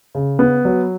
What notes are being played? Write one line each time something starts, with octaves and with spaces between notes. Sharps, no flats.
C#3
B3
F#3